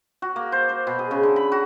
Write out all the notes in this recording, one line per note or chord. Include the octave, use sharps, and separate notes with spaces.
F#4
A#3
C5
C5
B2
G#4
C#3
D3
B5
F#4